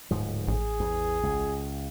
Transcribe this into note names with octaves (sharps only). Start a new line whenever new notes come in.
D1 G#2 F3
A1 G#4
E2
C#2